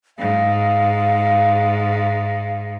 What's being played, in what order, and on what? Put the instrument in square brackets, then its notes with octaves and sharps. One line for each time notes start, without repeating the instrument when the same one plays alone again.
[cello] G#2 [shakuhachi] F5